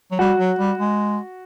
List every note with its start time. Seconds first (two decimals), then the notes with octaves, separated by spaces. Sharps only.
0.11 F#3
0.19 G3 F#4
0.38 F#3
0.59 G3
0.78 G#3